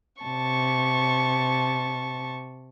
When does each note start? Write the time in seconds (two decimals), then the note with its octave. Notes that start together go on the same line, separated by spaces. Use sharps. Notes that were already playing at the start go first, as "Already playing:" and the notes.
0.21 C3 A5 C#6